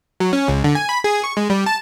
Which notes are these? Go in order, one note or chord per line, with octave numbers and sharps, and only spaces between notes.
F#3
C#4
C#2
D3
G#5
B5
G#4
C#6
G#3
G3
A5